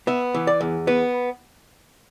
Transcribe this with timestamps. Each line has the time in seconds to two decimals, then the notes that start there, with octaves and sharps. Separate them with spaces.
0.07 B3 E5
0.35 E3
0.47 D5
0.61 E2
0.87 B3 B4